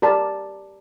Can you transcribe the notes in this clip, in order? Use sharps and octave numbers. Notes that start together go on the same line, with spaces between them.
G4 A#4 D5 A5